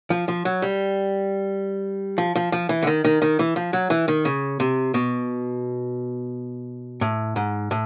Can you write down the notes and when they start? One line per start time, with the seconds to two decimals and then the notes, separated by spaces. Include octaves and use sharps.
0.10 F3
0.28 F3
0.45 F#3
0.62 G3
2.18 F3
2.36 F3
2.52 F3
2.69 E3
2.83 D3
2.87 D#3
3.05 D#3
3.22 D#3
3.39 E3
3.56 F3
3.73 F#3
3.90 E3
4.08 D#3
4.25 C#3
4.60 C3
4.94 B2
7.01 A2
7.36 G#2
7.71 A2